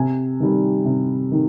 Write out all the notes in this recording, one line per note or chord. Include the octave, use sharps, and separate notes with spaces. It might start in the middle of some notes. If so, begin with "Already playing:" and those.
Already playing: C3 G#5
D#3 G3
C3
D#3